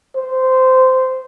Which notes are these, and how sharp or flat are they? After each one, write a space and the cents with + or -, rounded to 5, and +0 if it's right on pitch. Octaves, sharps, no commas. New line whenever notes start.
C5 -15